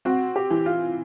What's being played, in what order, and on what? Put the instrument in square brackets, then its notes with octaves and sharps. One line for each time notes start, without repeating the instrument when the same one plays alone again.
[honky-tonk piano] C4 [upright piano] F#4
[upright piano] G4
[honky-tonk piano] E3
[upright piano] F4